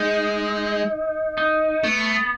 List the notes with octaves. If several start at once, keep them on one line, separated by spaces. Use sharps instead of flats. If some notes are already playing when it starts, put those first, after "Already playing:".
Already playing: G#3 D#4
D#4
A3 B3